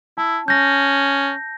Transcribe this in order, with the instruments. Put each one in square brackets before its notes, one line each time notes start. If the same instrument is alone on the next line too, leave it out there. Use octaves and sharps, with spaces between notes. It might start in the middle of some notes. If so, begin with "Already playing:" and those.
[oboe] E4 [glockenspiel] A5
[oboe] C#4 [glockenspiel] G6 A#6